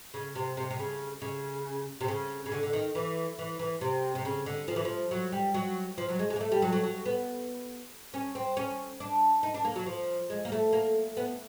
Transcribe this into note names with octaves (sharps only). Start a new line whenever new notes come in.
C#3
C3
C3
C3
C#3
C#3
C3
C#3
C#3
D3
D3
D#3
E3
E3
E3
C3
C3
C#3
D3
F3
E3
F3
F#3
G3
F#3
F3
F#3
G#3
G#3
A#3
A3
G3
F#3
F#3
F#3
B3
C#4
C4
C#4
D4
D#4
D4
A#3
F#3
F3
G#3
A#3
A3
A#3
B3